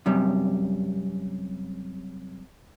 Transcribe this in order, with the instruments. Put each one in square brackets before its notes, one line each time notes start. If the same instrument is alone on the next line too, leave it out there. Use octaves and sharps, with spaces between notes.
[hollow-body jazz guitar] F#2 C3 G3